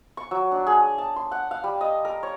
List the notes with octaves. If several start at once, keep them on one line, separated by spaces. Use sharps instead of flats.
C#6
F#3
D4
G#4
A5
C6
F#5
F5
G3
D#5
A#4
C#5